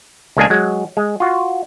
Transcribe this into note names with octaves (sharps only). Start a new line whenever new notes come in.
C#2 G#3 A#3 D4 G#4 G#5
F#3 G#3
G#3
F4 F#4